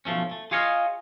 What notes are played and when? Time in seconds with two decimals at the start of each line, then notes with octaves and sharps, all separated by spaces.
0.05 B1 F3 A3 C#4
0.31 A3
0.51 F4 G#4 C#5 D#5 F5